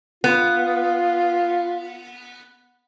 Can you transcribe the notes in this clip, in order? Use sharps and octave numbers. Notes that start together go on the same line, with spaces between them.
B3 F4